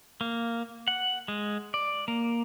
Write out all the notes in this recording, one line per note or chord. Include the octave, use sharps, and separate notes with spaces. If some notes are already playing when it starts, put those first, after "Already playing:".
A#3
F#5
G#3
D5
A#3